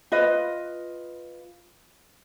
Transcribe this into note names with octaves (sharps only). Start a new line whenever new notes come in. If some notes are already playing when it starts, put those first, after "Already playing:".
F4 B4 D#5